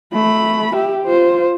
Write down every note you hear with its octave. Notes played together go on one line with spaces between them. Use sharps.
A3 B5
G4 E5
F4 C5